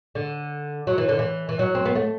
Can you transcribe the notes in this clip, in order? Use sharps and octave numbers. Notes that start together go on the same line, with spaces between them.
D3
F#3
E3
D3
E3
E3
F#3
C4
B3
A3